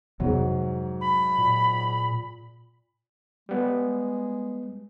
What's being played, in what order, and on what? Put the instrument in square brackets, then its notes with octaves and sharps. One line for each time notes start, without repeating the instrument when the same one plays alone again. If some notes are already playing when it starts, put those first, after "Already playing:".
[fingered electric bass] F2 C3 E3 [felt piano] G#2 F#3
[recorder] B5
[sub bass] A#2
[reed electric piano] G3 B3 [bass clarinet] G#3